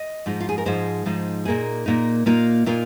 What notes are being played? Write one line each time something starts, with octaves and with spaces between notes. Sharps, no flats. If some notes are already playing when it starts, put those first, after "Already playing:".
Already playing: D#5
G#2 F3 G#3 D#4
F4
G#4
A#4
G#2 F3 G#3 D#4 C5
G#2 F3 G#3 D#4
A#2 A#3 D#4 G#4
A#2 A#3 D#4
A#2 A#3 D#4 F4
A#2 A#3 D#4 F4